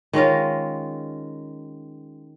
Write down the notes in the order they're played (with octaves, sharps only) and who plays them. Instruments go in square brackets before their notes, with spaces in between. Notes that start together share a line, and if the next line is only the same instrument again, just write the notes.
[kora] D#3 G#3 C#4 F4